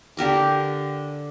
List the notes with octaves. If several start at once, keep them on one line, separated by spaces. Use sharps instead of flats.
D3 G4 A#4 D6